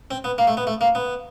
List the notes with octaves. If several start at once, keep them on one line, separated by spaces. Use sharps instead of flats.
C4
B3
A#3
A3
B3
A3
A#3
B3